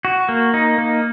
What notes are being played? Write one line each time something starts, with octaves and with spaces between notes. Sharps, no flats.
F#4
A#3
D#4
A#3